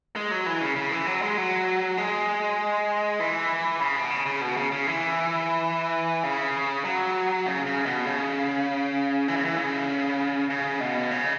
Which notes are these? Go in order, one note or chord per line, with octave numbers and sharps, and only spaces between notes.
G#3
F#3
E3
C#3
C#3
E3
F#3
G#3
F#3
G#3
E3
C#3
B2
C#3
C#3
B2
C#3
C#3
E3
C#3
F#3
C#3
C#3
B2
C#3
E3
C#3
E3
C#3
C#3
B2
C#3